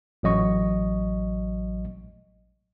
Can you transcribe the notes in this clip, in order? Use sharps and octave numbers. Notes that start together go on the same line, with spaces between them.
A1 F#3 D#5 C#6